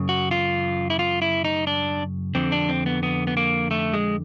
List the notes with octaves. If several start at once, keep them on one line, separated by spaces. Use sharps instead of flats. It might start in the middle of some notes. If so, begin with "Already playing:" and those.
Already playing: F#2 C#3
F#4
F4
E4
F4
E4
D#4
D4
F2 D3 C4
D4
C4
B3
B3
B3
A#3
A3
G#3